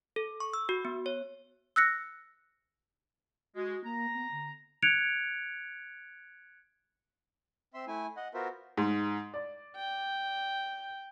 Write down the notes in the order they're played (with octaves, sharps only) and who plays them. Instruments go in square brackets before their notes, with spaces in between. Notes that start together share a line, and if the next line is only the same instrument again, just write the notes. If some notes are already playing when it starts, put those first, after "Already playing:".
[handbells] A4
C#6
E6
F#4
B3
C#5
[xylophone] E6 F#6 A#6 C#7
[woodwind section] G#3 [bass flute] F#4
[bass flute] A#3 [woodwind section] A#5
[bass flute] B3
D3
[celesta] F#6 G#6 C#7 D7 F7
[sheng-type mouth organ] C4 E5 C6 E6
A3 E4 G#5
D#5 F#5
B3 F4 F#4 A#4 C5 E5
[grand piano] G#2
D5
[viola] G5